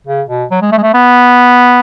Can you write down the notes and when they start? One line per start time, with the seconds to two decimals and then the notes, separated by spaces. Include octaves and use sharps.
0.07 C#3
0.29 B2
0.51 F#3
0.62 G#3
0.72 A3
0.78 G#3
0.83 A3
0.94 B3